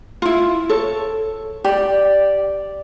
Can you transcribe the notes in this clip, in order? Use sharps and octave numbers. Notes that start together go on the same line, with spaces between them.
E4 F4
A4 C#5
G4 D5